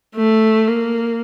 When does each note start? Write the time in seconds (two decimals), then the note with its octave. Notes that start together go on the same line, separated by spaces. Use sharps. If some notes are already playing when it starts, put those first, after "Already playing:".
0.16 A3
0.68 A#3